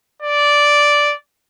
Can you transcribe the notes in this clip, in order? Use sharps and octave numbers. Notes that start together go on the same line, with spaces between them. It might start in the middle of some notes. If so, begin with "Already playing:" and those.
D5